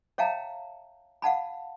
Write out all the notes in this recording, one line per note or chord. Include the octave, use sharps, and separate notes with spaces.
C#5 E5 F5 G5 A5 A#5
F5 F#5 A5 B5